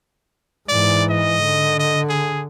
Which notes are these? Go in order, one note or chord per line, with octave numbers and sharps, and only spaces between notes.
G#2 E3 D5
D#5
D3
D#5
G#4